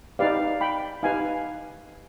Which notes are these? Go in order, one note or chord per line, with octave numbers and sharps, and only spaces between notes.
D#4 G4 B4 D5 F5
G5 B5
D#4 G4 B4 F5 G#5